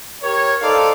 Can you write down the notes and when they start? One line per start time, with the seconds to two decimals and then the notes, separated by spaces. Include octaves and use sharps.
0.22 G4 A#4 C#5
0.61 D#4 A4 C5 D5 F5